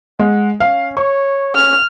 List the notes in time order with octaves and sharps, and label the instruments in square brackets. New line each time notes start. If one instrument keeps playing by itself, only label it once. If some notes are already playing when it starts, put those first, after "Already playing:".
[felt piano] G#3 [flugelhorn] F#5
[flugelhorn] C#4 [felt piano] F5
[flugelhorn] C#5 [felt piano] C#6
[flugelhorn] C#4 [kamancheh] F6